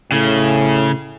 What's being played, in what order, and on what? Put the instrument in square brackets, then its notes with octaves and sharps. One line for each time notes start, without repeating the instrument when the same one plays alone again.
[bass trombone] A2 [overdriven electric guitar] C#3